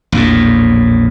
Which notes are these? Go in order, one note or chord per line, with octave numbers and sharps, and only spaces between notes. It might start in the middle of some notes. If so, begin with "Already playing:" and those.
A#1 E2 A2